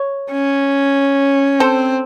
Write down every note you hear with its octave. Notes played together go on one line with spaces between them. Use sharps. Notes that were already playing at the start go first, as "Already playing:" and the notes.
Already playing: C#5
C#4
C4 A4 C5